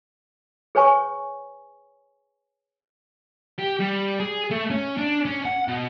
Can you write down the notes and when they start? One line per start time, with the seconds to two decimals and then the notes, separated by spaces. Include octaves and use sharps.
0.75 G#4 B4 C#5 G#5 C#6
3.58 G4
3.79 G3
4.20 G#4
4.51 A3
4.70 C#4
4.97 D4
5.25 C#4
5.45 F#5
5.68 B2